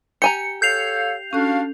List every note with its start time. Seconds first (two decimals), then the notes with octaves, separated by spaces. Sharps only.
0.22 G4 G#5 A#5 C#7
0.62 A4 C#5 F5 G6 C7 F7
1.33 C#4 D4 F#4 A4 F5 F#6